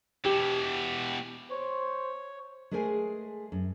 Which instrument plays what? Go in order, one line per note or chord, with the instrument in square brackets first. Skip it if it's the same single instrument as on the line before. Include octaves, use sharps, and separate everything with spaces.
[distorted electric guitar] B2 E3 [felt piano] G4
[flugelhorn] C5 [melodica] C#5
[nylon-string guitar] G#3 A3 G#4 A#4 C5 G#5
F#2